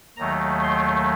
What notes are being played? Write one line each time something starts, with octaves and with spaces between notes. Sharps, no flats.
D#2 D#3 F#3 A3 A#5
C6